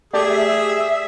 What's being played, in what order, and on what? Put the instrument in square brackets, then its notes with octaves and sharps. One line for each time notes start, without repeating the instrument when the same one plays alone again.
[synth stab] A3 G4 D5 [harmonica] G#4 [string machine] E5